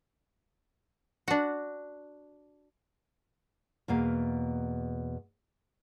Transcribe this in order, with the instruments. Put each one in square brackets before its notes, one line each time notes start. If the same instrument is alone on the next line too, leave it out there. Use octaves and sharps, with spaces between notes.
[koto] D4 F#4
[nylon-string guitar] E2 B2 A#3 F5